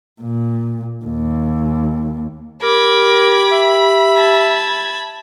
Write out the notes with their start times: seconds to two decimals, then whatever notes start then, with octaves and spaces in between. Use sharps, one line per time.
0.21 A#2
1.05 D#2
2.63 G4 A#4 B5 D6 G#6
3.52 E5
4.16 A5 G#6